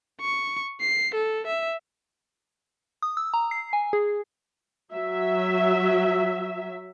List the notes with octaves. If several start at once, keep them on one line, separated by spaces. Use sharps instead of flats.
C#6
C7
A4
E5
D#6
E6
A#5
C7
G#5
G#4
F#3 E5